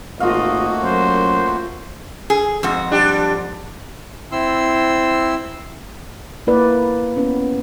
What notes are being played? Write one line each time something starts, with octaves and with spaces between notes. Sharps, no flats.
G#1 A3 A#3 F4 F#4 D#5 F5
F#2 C5
G#4
F2 G#2 F#4
G3 D4 G4
C4 E4 C6 E6
A#3 E4 B4 D5
B3 C#4 B4